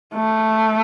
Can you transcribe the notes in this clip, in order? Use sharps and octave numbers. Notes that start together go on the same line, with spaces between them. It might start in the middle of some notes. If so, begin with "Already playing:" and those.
A3